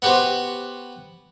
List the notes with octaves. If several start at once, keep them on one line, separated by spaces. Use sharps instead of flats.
B3 F#4 G4 B4 C5